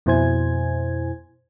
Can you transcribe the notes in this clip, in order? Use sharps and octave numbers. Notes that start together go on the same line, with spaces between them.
F2 B2 E4 C5 G#5 G#6